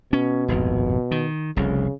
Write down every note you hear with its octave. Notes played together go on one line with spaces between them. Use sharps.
B2 C#4
D#1 G#1 F2
D#3
F1 C2 C#3